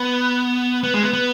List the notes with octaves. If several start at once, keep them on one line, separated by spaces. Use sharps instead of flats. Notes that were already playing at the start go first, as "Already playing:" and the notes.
Already playing: B3
B3
G#3
B3
B3